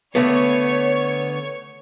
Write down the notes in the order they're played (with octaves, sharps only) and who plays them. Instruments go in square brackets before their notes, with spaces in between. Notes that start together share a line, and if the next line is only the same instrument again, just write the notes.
[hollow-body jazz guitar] D3 A3 B3 [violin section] C#5